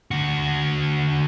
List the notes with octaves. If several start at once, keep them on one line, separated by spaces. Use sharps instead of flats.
D3 F#4